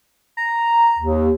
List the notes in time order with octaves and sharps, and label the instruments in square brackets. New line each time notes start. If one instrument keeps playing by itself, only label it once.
[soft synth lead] A#5
[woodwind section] D#2